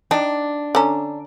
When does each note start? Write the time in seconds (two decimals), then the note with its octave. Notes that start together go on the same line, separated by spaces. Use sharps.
0.11 D4 D#4 G5
0.75 D3 C#4 A5 A#5